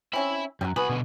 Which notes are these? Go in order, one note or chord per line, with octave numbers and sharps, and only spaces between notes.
C4 C#4 E4 E5 B5
F#2 F#3 G3
C2 B3 F#4 G#4 B5
B2 D3